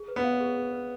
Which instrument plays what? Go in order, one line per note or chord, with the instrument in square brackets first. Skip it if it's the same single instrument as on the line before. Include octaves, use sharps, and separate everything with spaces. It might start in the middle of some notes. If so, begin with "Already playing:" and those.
Already playing: [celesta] G#4
B4
[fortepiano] B3
[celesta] F5
G#4
G#4
B4